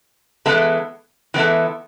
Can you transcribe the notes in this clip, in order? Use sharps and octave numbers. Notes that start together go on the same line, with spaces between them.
E3 G#3 B3 E4 A4
E3 G#3 B3 E4 A4